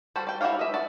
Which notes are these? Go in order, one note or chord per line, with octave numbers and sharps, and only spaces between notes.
G3 F#4 A4 C5
D5 G5
E4 F#4 G4 C#5 F5
D#5 E5
F#4 D5